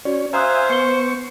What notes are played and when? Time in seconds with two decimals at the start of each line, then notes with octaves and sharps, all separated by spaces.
0.05 C#4 F#4 C#5 D5
0.33 C5 E5 F5 G#5 A#5 D#6 F#6
0.70 B3 C#6 C7 G7